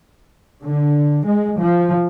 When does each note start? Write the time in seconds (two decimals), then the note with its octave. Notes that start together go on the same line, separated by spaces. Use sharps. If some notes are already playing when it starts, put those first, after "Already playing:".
0.61 D3
1.24 G#3
1.57 F3